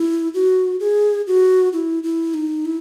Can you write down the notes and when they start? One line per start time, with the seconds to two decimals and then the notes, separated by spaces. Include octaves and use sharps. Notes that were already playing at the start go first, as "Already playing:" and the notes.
Already playing: E4
0.34 F#4
0.80 G#4
1.27 F#4
1.73 E4
2.03 E4
2.34 D#4
2.65 E4